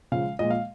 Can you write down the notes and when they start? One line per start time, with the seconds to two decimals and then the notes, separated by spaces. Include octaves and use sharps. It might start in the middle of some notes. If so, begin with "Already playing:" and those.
0.12 C#3 F3 G#3 F5
0.39 A#2 F3 G#3 D#5
0.51 F5